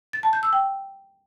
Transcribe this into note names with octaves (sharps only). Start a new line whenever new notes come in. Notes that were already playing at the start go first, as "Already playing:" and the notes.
A6
A5
G6
E6
G5